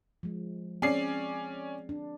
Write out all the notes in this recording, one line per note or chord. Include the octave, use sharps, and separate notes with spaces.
F3 G#3
C4 C#4 G#4 D5 C7
D4